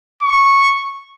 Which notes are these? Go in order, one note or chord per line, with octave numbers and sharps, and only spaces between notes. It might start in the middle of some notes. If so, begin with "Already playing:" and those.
C#6